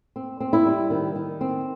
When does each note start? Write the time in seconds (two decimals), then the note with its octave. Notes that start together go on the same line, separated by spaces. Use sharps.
0.16 C4
0.40 C4
0.53 E4
0.66 G3
0.90 D#3
1.15 D#3
1.41 C4